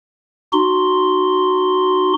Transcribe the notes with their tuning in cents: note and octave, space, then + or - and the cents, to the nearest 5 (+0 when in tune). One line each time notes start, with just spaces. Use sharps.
D#4 -35 F#4 +0 C6 +0